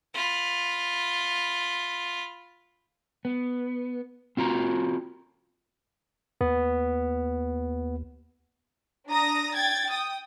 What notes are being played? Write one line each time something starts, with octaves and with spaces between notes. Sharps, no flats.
F4 B5
B3
C4 F4 F#4 A#5
D#2 B3
D4 A#5 D#6 A#6
G5 G#6 A6
G5 D#6